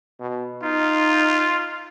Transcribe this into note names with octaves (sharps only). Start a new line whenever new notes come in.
B2
D#4 F4